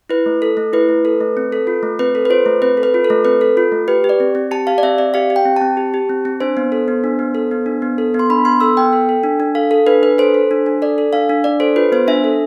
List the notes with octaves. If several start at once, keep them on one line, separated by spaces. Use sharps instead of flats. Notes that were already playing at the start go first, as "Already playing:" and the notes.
E4 B4
A3
A4
A3
E4 B4
A3
A4
A3
C4
A4
F4
A3
C4 B4
A4
B4
F4 C5
A3
C4 B4
A4
B4
F4
A4
A3
C4 B4
A4
F4
A3
G4 B4
G4
D5
C4
C4
G4 A5
G4 F5
D5
C4 E5
C4 D5
G4 F5
G4
G5
C4
C4 A5
G4
G4
C4
C4
D4 C5
B3
A4
B3
D4
B3
A4
B3
D4
B3
A4
B3
C6
D4 B5
B3 C6
A4 E6
B3 G5
A4
A4
D4
D4
A4 F5
A4
D4 B4
D4 B4
A4 C5
A4
D4
D4
A4 D5
A4
D4 F5
D4
D4 D5
A4 C5
F4 B4
B3 C5
D4 E5
A4